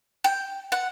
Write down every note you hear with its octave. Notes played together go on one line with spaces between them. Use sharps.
G5
F#5